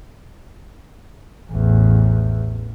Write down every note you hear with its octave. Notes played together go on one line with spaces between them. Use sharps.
A1 E2